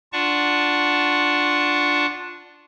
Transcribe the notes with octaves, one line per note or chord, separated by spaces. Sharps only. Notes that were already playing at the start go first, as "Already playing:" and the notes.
D4 F4 D5 F#5 A5 C#6